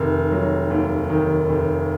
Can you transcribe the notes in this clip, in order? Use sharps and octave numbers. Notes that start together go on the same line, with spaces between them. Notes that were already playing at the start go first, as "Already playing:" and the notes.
Already playing: F1 D#3
F#3
D#2
D#3
F1